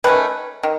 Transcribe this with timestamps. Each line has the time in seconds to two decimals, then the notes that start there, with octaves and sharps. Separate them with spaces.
0.04 D#3 A3 C#4 B4
0.63 D#3